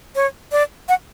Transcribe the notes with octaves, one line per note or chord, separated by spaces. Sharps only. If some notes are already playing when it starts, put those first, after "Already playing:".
C#5
D5
F#5